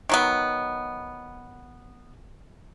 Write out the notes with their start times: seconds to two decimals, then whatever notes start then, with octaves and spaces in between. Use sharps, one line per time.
0.09 D#3 F#3 B3